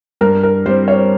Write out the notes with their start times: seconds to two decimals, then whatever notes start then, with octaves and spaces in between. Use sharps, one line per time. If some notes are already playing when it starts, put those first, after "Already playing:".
0.21 G2 A#4
0.43 A#4
0.66 G3 C4 C5
0.88 C#5